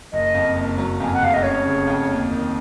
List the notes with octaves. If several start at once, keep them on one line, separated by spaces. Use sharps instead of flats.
F#1 D#5
F2
F#1
F#3
F2 G#5
F#5
F1 F5
D#5
C#4 C#5
C#3
F2
D#2
D#3